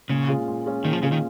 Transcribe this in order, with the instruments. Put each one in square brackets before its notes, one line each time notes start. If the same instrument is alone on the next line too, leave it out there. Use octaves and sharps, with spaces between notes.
[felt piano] A#2 [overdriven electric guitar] C#3
[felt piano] G#3 C#4 F4
A#2
G#3 C#4 F4
[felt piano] A#2 [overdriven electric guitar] D#3
[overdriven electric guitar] F3
[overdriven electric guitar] C#3 [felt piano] G#3 C#4 F4
[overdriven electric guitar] D#3